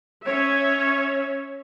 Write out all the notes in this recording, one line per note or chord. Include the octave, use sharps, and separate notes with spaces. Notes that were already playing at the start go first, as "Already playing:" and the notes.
C#4 C#5 E5